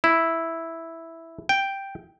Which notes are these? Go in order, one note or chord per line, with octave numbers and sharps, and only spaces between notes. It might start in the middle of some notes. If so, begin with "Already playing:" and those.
E4
G5